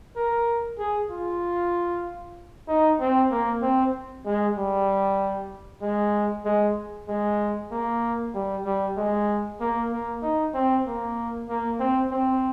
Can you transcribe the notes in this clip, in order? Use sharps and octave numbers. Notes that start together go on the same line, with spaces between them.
A#4
G#4
F4
D#4
C4
A#3
C4
G#3
G3
G#3
G#3
G#3
A#3
G3
G3
G#3
A#3
A#3
D#4
C4
A#3
A#3
C4
C4